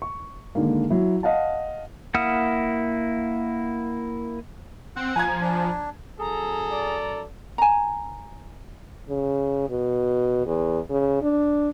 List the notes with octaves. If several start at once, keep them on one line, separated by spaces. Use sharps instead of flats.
C#6
D3 D#3 G#3 A#3
F#3 E4
D#5 F5 F#5 A5
A#3 E4 F#5 D#6 F6
C4 F#5
F3 G#5 A#5 G#6
D4
F#2 G#4 A4 A#5
D5
G#5 A#5
C#3
B2
E2
C#3
D4